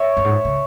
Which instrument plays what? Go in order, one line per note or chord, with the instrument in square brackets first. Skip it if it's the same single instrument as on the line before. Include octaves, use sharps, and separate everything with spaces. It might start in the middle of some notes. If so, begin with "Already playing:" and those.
Already playing: [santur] C#5 E5
[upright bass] F#2
G#2
C#3